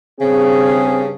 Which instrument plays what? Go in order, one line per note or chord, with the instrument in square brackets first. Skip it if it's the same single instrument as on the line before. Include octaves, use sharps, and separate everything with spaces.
[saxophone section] G2 C#3 [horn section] C4 G#4